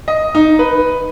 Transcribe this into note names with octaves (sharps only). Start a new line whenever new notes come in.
D#5
D#4
B4